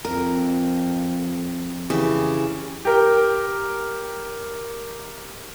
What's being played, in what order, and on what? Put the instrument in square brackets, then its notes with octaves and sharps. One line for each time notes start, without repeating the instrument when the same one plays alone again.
[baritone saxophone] F2 [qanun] A#4
[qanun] C#3 E3 G4
[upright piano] G4 A#4 G5